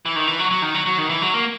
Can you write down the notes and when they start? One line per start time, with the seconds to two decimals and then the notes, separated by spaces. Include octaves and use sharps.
0.06 E3
0.16 D#3
0.27 E3
0.39 F#3
0.51 F#3
0.62 D#3
0.75 F#3
0.86 F#3
0.98 D#3
1.10 E3
1.22 F#3
1.34 A#3